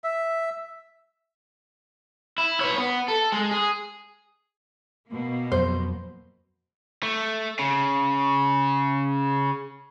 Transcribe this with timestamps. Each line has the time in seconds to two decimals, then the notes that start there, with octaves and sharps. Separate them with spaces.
0.04 E5
2.38 E4
2.61 B4 C#5
2.78 B3
3.08 A4
3.32 G#3
3.51 G#4
5.08 B2 A#3
5.52 F2 F#3 C5
7.03 A3
7.59 C#3